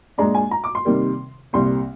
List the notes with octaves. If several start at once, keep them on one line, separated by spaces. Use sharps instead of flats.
A#2 G#3 D4 A#5
G#5
A#5
D6
C6
C3 D#3 G3 A#3
C2 A#2 G3 C4 C6